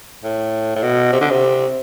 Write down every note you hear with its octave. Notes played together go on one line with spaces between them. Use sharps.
A2
A2
B2
C3
D3
C3